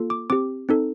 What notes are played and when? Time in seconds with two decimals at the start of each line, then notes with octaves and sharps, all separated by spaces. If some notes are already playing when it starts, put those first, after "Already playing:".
Already playing: A#3 F4 A4
0.10 D6
0.30 C4 G4 D6
0.69 C4 D#4 A4